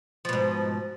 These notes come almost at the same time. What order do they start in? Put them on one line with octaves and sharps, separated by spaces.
F3 B2 G#2